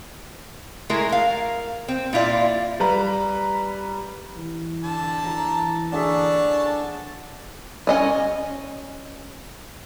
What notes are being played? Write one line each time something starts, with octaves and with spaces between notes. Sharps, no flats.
G#3 A3 E4 A#4
A#4 F5
C4
A#2 E4 F4 D5
G3 B4 A#5
E3
D3 A5
E3 A#5
D3 D4 G#4 C#5 E5 A5
C#4 D#5 G#5